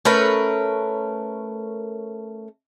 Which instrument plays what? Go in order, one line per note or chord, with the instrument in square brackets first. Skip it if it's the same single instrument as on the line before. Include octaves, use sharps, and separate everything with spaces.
[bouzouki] A3 C#4 A#4 B4